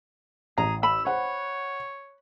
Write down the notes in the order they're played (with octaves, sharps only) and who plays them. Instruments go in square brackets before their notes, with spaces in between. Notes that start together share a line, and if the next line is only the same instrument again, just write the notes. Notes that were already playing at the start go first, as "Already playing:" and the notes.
[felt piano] A1 [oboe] G#4 [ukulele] A#5
[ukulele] B5 [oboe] E6
[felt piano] C5 F#5 [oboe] C#5